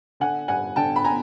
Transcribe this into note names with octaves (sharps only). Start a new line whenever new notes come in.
D3 F#5 G#5
G2 F#5 G#5
D3 G5 A5
B5
G#5 A#5